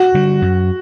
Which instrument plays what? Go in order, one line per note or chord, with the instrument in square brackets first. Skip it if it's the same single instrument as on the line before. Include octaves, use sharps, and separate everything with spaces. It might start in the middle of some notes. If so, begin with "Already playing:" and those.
Already playing: [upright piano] F#4
[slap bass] D3 G3
F#2